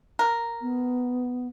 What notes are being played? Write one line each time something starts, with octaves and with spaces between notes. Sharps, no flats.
A#4
B3